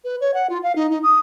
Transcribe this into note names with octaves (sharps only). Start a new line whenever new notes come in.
B4
C#5
F#5
F4
F5
D#4
D#4
D#6